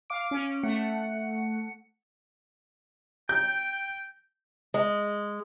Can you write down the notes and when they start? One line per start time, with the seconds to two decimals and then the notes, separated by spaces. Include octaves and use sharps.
0.10 F5 D6 D7
0.31 C#4
0.63 A3 F#5 C#7
3.29 G5 G6
4.74 G#3